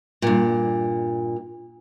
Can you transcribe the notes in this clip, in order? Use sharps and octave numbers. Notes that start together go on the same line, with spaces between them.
G2 A#2